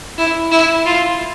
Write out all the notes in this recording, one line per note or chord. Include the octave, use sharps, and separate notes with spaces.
E4
E4
F4